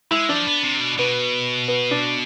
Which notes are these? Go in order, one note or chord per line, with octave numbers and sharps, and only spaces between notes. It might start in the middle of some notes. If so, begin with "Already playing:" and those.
G#3 E4
F3 D4
B3
C3
B2
B2 B3
B3
D4